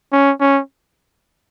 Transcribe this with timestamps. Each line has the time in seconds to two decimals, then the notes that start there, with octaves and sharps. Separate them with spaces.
0.12 C#4
0.40 C#4